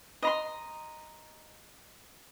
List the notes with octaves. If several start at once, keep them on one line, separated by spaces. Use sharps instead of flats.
D#5 A#5 C6